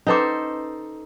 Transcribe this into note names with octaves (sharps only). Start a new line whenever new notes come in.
C#4 D#4 A4 B4 C5 D6